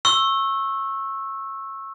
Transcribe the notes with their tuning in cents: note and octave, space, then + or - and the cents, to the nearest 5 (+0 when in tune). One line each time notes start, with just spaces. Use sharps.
C#6 -25 E6 +0